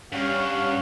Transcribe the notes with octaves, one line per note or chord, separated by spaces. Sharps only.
G2 G3 C#4 C#5 F5 F#5